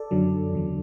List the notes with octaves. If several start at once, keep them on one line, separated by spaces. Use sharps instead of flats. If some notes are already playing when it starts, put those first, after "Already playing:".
Already playing: A4 D5
F#2 D3 F#3
E2 D3 F#3